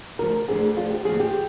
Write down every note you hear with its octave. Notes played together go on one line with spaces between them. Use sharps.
D2 D3 F3 A#4
D2 D3 F3 G#4
D2 D3 F3 F4
G4
D#2 D3 F3 G#4
G4